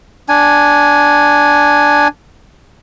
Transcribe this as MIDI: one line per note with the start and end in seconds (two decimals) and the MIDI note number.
0.29 2.08 62
0.29 2.08 80